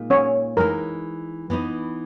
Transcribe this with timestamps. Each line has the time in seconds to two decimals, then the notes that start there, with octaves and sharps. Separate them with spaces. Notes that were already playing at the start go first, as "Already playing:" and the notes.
Already playing: A#2 G#3 D#4
0.10 C#4 C#5
0.57 E3 G#3 D#4 A#4
1.50 E3 B3 D#4